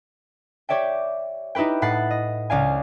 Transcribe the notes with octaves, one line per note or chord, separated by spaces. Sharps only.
G4 C#5 D5 E5 G5
D#4 E4 G4 B4 G5
A2 B4 F#5 A6 C7
D#5
C#2 D5 F5 G#5